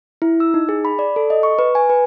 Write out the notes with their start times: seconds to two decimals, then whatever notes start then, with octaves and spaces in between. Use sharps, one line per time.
0.22 E4
0.40 E6
0.54 D#4
0.69 G#4
0.85 B5
0.99 D5
1.16 A4
1.30 D#5
1.43 C#6
1.59 B4
1.75 G#5
1.90 B4